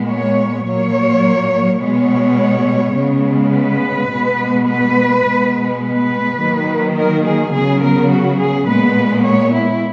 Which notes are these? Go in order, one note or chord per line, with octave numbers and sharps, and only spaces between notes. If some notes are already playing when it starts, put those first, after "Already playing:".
Already playing: A#2 G#3 B3
C#5
A#2 F#3 A#3 C#5
B2 G#3 B3 C#5
C#3 G#3 B3
B4
B2 G#3 B3
B4
B2 G#3 B3
B4
D#3 F#3 A#3
A#4
G#4
C#3 F#3 B3 G#4
A#4
F#4
G#4
A#2 G#3 B3 B4
C#5
E4